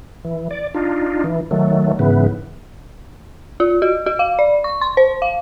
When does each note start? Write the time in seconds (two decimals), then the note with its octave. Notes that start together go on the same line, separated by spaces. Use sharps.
0.25 E3
0.51 D5
0.74 D4 D#4 F4
1.24 E3
1.51 D#3 F#3 A3
1.99 G#2 C#3 E3 B3
3.60 F4
3.82 F#4
4.06 F#4
4.19 F5
4.39 D5
4.64 C#6
4.81 C6
4.97 C5
5.22 F5